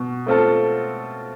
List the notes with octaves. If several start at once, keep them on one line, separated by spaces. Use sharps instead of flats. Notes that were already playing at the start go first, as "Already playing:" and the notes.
Already playing: B2
A3 C4 F4 A4